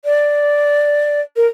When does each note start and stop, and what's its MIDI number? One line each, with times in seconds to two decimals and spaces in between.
0.05 1.21 74
1.36 1.47 70